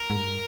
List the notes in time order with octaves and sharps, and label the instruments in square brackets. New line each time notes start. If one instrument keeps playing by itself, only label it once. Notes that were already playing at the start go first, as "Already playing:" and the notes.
Already playing: [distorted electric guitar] A#4
[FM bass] G#2
G2